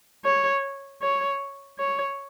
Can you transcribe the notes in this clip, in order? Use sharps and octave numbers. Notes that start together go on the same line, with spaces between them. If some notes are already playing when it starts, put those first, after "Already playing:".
C#5
C#5
C#5